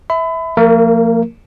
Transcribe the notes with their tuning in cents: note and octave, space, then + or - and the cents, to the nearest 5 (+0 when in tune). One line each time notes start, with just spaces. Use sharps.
E5 -15 B5 +30
F3 +0 A#3 -40 A#4 +0